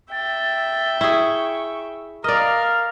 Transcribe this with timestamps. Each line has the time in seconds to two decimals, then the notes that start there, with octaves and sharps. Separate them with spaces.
0.12 E5 G5 A6
1.01 E4 G#4 C#6
2.24 A#4 D5 D#5 F5 F6